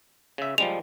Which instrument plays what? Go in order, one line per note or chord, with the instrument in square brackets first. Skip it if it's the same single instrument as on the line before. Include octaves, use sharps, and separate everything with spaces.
[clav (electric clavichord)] C#3 E5
[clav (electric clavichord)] F3 G3 G#3 [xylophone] F7